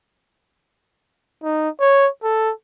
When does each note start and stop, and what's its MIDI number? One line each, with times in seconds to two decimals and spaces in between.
1.44 1.69 63
1.81 2.08 73
2.23 2.52 69